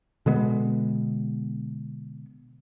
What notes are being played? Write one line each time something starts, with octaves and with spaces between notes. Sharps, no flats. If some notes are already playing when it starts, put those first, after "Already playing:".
B2 D3 G#3 B3